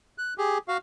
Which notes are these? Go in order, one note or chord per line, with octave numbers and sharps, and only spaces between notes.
F#6
G4 G#4
F#4 F5